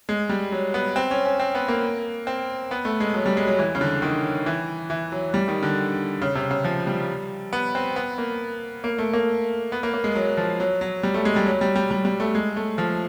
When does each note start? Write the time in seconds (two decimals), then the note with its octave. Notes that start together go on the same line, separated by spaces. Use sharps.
0.09 G#3
0.29 G3
0.52 F#3
0.74 B3
0.96 C4
1.11 C#4
1.25 C#4
1.40 C4
1.55 B3
1.68 A#3
2.27 C4
2.71 B3
2.85 A3
3.00 G#3
3.14 F#3
3.26 G3
3.37 G#3
3.47 F#3
3.59 E3
3.75 C#3
3.81 D3
4.02 D#3
4.46 E3
4.90 E3
5.12 F#3
5.34 G3
5.48 D#3
5.63 D3
6.22 C#3
6.35 C3
6.51 C#3
6.65 F3
6.87 G3
7.53 B3
7.75 C4
7.96 B3
8.18 A#3
8.84 A#3
8.98 A3
9.13 A#3
9.72 B3
9.83 A#3
9.94 A#3
10.04 G#3
10.15 F#3
10.37 F3
10.60 F#3
10.81 F#3
11.03 G3
11.14 A3
11.25 G#3
11.36 G3
11.46 F#3
11.61 G3
11.76 G3
11.91 G3
12.05 G3
12.20 A3
12.35 G#3
12.56 A3
12.78 F3